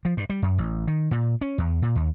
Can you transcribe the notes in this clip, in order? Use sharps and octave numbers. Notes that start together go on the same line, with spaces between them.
F3
G2
G3
F#2
A1
D#3
A#2
C#4
E2
A#2
D#2